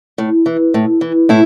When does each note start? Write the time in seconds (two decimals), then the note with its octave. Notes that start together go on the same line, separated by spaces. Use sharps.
0.18 A2
0.46 E3
0.74 A2
1.01 E3
1.29 A2 E4